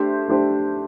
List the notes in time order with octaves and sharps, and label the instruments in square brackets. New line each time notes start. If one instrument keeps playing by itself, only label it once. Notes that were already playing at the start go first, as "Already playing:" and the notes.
Already playing: [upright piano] A3 D4 G4 C5
A3 D4 G4 C5